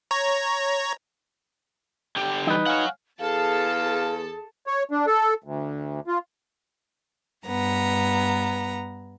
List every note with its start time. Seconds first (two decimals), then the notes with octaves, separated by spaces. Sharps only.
0.11 C#5 A#5
2.16 D3 G4 G5
2.47 E3 G3 D#4 B4
2.67 C#5 F5 F#5 G#5 F6
3.20 E2 G#4 A4 F5 A5
4.67 C#5
4.91 D4
5.07 A4
5.44 D2
6.07 F4
7.46 G2 B3 A#5